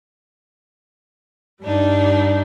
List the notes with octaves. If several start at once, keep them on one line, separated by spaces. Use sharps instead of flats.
G2 G3 D4 D#4